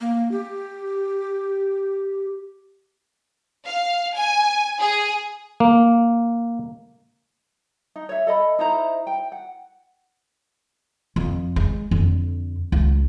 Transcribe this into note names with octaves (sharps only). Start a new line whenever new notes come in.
A#3
G4
F5
G#5
G#4
A#3
D#4
C#5 E5
A4 D#5 B5
D#4 E4 C5 A#5
G5
F#5
F2
G#3
F2 D3
C#2